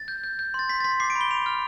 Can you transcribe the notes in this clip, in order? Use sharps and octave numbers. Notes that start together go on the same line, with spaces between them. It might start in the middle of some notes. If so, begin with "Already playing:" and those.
Already playing: A6
G6
G6
G6
C6 A6
C6 B6
A6
C6 B6
D6 C7
D7
B5
G7
B5 F7
F6